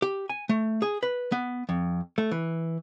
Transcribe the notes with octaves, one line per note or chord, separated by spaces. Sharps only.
G4
G#5
A3
G#4
B4
B3
F2
A3
E3